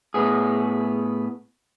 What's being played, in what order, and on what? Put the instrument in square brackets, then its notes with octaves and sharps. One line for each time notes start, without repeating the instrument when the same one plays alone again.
[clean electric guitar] A2 B3 G#4